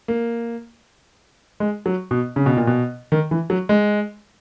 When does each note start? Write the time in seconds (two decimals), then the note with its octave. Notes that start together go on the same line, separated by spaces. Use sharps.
0.08 A#3
1.60 G#3
1.86 F#3
2.11 B2
2.36 C#3
2.46 B2
2.57 A#2
2.67 B2
3.12 D#3
3.31 E3
3.50 F#3
3.69 G#3